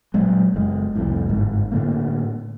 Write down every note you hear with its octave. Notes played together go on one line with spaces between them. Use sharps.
A#2 F#3 G#3
F#1 G#3
C2 F2 A2
G1 G#2
A2 D3 A#3